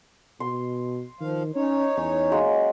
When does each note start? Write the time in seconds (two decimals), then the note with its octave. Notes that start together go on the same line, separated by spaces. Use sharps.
0.40 B2 C6
1.20 D#3 F3 F5
1.55 C#4 D#4 C#5
1.97 E2 C#4
2.31 F#3 G#3 A#3